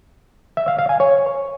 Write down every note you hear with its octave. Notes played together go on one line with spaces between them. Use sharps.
E5
F5
F5
G#5
C#5